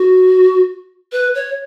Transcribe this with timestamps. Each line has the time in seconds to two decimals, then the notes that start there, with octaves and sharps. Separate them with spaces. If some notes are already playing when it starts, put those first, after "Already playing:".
Already playing: F#4
1.12 B4
1.35 C#5